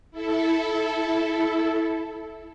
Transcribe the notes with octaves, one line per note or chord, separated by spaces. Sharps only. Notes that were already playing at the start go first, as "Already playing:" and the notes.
E4 A4